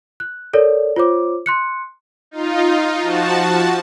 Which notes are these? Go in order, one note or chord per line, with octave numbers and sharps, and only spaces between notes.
F#6
A4 A#4 C#5 D5
F4 C5 C#5 D6
C6 F#6 C#7
D#4 F4
F3 F#4 A5